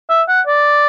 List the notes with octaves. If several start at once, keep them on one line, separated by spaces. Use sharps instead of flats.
E5
F#5
D5